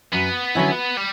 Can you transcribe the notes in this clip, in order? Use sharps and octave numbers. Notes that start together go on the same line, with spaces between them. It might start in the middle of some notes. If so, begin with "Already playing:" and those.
F#2 B3
D3 F#3 C#4 E4
G3